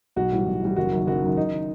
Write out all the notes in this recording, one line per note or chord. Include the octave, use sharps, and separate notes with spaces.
B1 F#4
A2 E3 G3
B1
A2 E3 G3
F#1 F#4
F#2 D#3
F#1 F#4
F#2 D#3
F#1 D#4
D#3